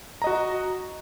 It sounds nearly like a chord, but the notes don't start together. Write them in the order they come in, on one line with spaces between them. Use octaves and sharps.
A#5 D#5 F#4